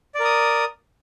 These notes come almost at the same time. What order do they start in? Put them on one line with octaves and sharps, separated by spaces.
D5 A#4 D#6